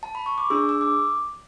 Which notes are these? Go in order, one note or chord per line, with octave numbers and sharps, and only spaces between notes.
A5
B5
C#6
D6
D4 G#4 E6
E6
D6